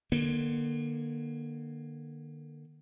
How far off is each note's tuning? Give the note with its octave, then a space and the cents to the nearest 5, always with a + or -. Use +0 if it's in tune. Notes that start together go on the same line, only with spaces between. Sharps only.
D3 +35 A#3 +30